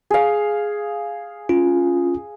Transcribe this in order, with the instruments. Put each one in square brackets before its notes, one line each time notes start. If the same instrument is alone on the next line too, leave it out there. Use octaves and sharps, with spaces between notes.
[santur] G#4 F5
[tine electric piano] C#4 F4